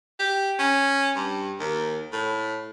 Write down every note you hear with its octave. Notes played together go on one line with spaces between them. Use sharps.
G4
C#4
G2
D#2
A2